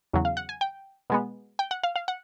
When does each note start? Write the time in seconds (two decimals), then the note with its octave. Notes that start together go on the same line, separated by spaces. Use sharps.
0.13 E2 C#3 F#3
0.25 F5
0.37 F#5
0.49 G#5
0.61 G5
1.10 B2 G#3 B3
1.59 G5
1.71 F#5
1.83 F5
1.96 F5
2.08 F#5